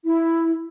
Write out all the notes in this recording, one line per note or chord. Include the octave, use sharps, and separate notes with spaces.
E4